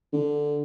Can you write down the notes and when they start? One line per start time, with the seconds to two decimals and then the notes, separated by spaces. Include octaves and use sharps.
0.13 D3